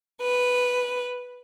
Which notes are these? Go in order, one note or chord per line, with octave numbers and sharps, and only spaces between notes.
B4